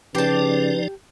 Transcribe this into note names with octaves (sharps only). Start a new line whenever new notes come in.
C#3 F3 D#4 G4 B4 D5 A5